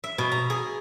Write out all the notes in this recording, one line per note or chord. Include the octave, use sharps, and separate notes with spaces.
E5
B2
A#5
G#4